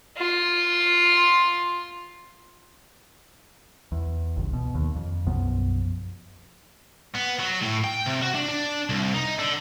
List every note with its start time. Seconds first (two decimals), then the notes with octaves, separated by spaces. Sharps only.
0.17 F4 C6
3.92 E2
4.36 G1 C#2
4.53 B2
4.75 D#2
4.96 F2
5.27 B1 F#2 F3 B3
7.15 B3
7.39 F#3
7.62 A2
7.84 G5
8.06 C3
8.22 F#4
8.35 D4
8.49 D4
8.89 C2
9.14 D#4
9.39 D3